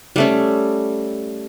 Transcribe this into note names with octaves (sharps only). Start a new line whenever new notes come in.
G3 A3 C#4